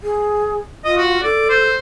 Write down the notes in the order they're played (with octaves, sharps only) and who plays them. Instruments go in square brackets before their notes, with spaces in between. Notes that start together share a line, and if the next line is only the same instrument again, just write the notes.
[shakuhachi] G#4
[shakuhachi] F4 [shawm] D#5
[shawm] F#4
[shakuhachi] A4 [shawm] D5
[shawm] C5